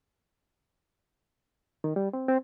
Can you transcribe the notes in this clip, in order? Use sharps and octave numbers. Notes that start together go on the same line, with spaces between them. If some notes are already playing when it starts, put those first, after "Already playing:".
D#3
G3
C4
C4